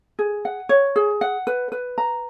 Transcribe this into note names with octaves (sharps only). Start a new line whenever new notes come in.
G#4
F#5
C#5
G#4
F#5
B4
B4
A#5